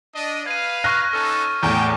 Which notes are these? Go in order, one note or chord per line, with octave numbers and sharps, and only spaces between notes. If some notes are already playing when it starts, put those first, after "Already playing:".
D4 D#5
B4 F5 G#6 D#7
C#6 F6 F#6 A#6
C#4 D#4 A4 F6
E2 A2 C#5 G5